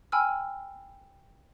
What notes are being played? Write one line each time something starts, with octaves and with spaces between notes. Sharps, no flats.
G5 G#5 B5 E6 F6